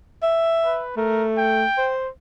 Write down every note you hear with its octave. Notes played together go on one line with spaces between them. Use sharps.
E5
B4
A3 A#4
G5
C5